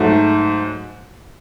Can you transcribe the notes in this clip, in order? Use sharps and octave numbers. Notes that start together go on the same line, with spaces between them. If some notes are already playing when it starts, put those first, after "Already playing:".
Already playing: G#2 F#3 A3